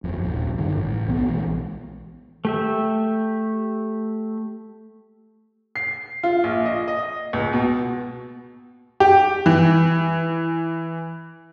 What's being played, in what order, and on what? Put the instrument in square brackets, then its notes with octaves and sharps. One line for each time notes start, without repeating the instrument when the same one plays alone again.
[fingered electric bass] G1 F2
D#1 A#1
G2 D3 D#3
A1
C2 B2 B3
A#1 E3 G#3
[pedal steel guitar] A3 G4 E5
[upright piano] C7
F4
A#1
D#5
D#5
C#2
B2
[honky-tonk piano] G4
E3